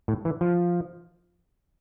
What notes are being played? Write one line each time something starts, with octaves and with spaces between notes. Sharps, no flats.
A2
E3
F3